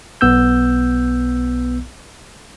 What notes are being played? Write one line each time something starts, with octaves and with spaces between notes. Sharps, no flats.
B1 B3 E6 G6